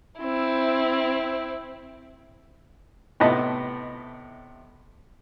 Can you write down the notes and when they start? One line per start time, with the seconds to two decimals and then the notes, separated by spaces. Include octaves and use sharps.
0.20 C4 E4
3.20 A2 C3 B3 D#5 A5 B5